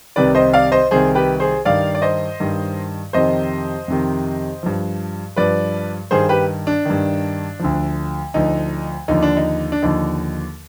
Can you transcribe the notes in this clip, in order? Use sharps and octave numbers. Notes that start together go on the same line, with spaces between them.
C2 C3 D#3 B4 D5
C5 D#5
D5 F5
C5 D#5
C2 C3 D#3 G#4 C5
G4 B4
G#4 C5
G2 D#3 D5 F5
D5
C5 D#5
G2 D#3
F2 C3 D#3 C5 D#5
F2 C3 D#3
G2 F3
G2 F3 B4 D5
G2 D#3 G#4 C5
G4 B4
D4
G2 D#3
D2 D3 F3
D2 D3 F3 D#4
D#2 D3 F3 D#4
D4
D#4
D4
D#2 D3 F3 D#4